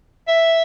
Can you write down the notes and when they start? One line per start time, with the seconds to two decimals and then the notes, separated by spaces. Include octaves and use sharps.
0.28 E5